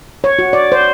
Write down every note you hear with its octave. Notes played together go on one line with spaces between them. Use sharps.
C#5
F#4
D5
C5